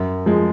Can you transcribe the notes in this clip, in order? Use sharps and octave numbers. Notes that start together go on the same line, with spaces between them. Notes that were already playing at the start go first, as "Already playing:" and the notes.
Already playing: F#2
F3 G#3